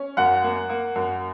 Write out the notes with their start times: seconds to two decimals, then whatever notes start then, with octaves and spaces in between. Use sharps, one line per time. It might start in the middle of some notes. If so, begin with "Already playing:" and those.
Already playing: C#4
0.17 F#2 F#5
0.44 A#3
0.70 A#3
0.95 F#2